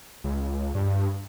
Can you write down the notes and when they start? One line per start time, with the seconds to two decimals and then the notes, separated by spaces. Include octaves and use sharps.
0.24 C#2
0.75 G2